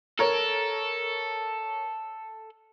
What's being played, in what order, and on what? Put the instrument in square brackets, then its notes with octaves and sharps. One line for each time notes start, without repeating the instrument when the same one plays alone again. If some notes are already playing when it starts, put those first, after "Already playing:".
[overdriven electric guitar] A4 [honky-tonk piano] A#4 C#5